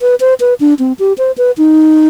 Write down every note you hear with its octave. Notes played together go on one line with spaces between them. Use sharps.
B4
C5
B4
D4
C4
G4
C5
B4
D#4